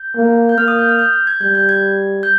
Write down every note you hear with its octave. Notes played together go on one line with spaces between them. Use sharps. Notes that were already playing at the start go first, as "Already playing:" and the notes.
Already playing: G6
A#3
G6
A#3 F6
D#6
G6
F6
G6
G6
G#6
G3 G6
G6
G#6
G6